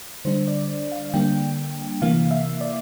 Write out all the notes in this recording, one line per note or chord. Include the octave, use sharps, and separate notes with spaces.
D3 G3 D4 C5
D5
F5
D3 G3 A#3 D4 G5
C3 E3 A#3 F5
E5
D5